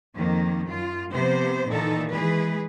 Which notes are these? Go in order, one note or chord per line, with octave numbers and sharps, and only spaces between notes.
F2 D#3 A#3
F#2 F4
C3 F3 B3 C5
A#2 D#3 E3 D#4 A4
E3 G#3 G#4 B4